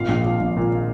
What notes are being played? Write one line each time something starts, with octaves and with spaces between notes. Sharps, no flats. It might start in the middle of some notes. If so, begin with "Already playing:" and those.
Already playing: G#1 A#2 F5
A#1
F3
A#1
A#2